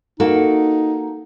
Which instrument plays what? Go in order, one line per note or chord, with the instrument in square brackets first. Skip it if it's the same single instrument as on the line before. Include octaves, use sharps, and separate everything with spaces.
[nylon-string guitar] A#3 F#4 A4 [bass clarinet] D#4